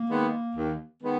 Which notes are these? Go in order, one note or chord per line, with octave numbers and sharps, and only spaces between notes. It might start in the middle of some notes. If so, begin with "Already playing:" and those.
Already playing: A#3
D#3 G#3 B3
D#2
D#3 G#3 B3